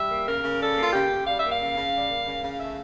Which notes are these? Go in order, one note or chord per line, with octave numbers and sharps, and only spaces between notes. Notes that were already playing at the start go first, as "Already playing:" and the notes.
Already playing: G3 E5
A#3
C#3 A#4
C#3
G3 A4
A#3
F4
C#3 G4
C#3
G3 F5
E5
A#3
F5
C#3
C#3
G3
A#3
C#3
C#3
A3 E5